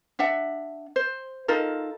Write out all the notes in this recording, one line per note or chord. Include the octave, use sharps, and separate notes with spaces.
D4 E5 F#5
C5
D#4 F4 A4 A#4